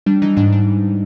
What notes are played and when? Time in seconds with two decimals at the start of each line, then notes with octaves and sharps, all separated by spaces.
0.06 G3 D4
0.22 E3 D#4
0.37 G#2 D4
0.52 D4